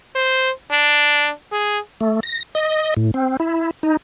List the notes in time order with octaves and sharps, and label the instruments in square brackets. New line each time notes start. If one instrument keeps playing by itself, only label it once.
[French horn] C5
D4
G#4
[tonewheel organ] A3
A#6
D#5
A2
C4
E4
D#4